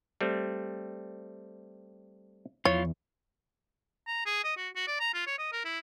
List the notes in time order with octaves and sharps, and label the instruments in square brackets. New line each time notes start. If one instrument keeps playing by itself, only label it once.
[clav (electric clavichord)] G3 A3 C4
[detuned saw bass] E2 [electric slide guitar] E3 F3 F4 [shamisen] C#5
[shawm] A#5
G#4
D#5
F#4
F#4
D5
A#5
F4
C#5
D#5
A#4
E4